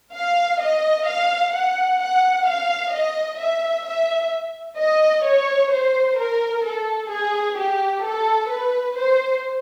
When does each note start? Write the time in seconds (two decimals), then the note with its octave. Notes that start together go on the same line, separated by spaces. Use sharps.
0.14 F5
0.60 D#5
1.06 F5
1.53 F#5
1.99 F#5
2.46 F5
2.92 D#5
3.39 E5
3.85 E5
4.77 D#5
5.24 C#5
5.71 C5
6.17 A#4
6.63 A4
7.10 G#4
7.56 G4
8.03 A4
8.49 B4
8.95 C5